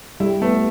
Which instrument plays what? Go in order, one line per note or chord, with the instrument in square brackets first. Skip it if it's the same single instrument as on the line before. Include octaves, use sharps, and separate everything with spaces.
[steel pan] G3 [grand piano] E4
[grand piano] A3 [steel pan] B3